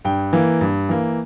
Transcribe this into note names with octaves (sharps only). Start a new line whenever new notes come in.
G2 G5
E3 A#3
G2
E3 A#3